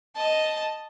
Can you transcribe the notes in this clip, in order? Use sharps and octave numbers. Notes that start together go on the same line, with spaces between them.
D#5 A5